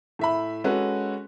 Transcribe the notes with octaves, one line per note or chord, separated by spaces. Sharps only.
A2 E5 B5
G#3 C#4 F#4 A4 B4